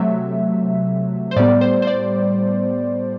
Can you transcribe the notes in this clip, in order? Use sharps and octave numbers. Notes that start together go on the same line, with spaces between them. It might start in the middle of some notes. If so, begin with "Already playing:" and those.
Already playing: C3 F#3 A3 E5
C5
A2 G3 B3 D5
C5
C5
D5